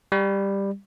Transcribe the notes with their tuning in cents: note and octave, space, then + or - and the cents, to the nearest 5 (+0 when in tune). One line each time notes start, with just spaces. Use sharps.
G3 +10